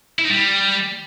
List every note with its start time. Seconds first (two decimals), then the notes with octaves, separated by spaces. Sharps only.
0.19 E4
0.24 D#4
0.29 G3